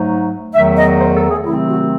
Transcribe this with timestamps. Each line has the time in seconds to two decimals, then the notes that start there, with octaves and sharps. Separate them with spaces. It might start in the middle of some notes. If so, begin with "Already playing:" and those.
Already playing: G#2 F#3 A3 D#4
0.54 E2 D#3 F#3 A3 E5
0.77 D#5
0.99 C5
1.15 A4
1.30 G#4
1.45 C3 D#3 F#3 A3 C4 E4
1.68 F#4